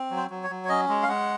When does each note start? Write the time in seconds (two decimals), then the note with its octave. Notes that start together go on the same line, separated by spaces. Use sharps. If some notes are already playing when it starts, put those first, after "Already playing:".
Already playing: C4
0.11 F#3
0.17 C5
0.30 F#3
0.44 C#5
0.50 F#3
0.65 C#5
0.69 C#4 D#5
0.89 G#3
1.03 F5
1.08 G#3 F#5